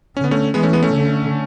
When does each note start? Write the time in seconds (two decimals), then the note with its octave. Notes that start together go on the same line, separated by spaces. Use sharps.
0.17 D3 C#4
0.24 B3
0.31 A3 C#4
0.54 E3 G#3 B3
0.63 A3 C#4
0.73 G#3 B3
0.83 A3 C#4
0.93 D3